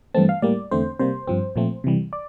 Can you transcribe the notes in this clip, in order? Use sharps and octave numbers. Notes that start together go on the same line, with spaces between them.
G2 E3 A3 C4 A5
F5
A2 G3 A#3 D5
E2 D3 A3 C4 C5
C3 G3 A#3 C5
G2 F3 C4
A#2 F3 A3 C4
C3 E3 G3
D5